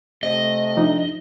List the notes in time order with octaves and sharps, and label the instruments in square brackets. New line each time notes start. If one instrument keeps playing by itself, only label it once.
[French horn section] C3 A3 [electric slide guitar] D#5
[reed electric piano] F3 D4 D#4